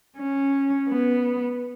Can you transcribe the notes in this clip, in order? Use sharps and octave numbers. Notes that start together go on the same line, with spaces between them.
C#4
B3